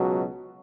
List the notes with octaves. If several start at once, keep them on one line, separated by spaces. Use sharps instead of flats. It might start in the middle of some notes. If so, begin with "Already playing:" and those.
Already playing: C#2 B2 F#3